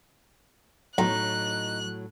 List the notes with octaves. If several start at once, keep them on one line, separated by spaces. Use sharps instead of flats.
B1 A2 F#3 D#4 F#6